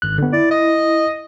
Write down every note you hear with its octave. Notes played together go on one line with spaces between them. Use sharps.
G#1 F#6
D3 B3
E4 D5
D#5